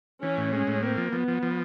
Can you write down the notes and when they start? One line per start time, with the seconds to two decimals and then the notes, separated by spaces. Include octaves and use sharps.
0.23 E3 C#4
0.37 A2
0.52 G#3 C#4
0.67 A2
0.82 A#3 C4
0.97 F3
1.12 F3 B3
1.28 F3
1.43 F3